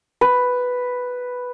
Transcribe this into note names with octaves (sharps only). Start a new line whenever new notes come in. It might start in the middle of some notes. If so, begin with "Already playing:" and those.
B4